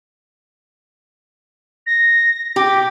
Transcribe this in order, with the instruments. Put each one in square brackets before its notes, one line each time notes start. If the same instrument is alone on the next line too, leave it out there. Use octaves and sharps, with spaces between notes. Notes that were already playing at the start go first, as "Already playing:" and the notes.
[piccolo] A#6
[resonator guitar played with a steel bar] G4 [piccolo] D6